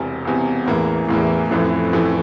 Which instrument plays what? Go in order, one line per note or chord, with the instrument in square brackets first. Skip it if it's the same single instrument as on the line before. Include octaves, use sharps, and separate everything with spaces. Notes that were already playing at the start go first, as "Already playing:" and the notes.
Already playing: [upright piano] E1 E2 C3
E1 E2 C3
[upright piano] A1 A2 E3 A#3 [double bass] E2
[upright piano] A1 A2 E3 A#3 [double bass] E2
[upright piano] A1 A2 E3 A3 [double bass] F2
[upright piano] A1 A2 E3 A3